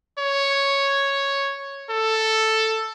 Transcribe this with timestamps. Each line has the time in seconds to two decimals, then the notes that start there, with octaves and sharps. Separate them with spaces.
0.19 C#5
1.90 A4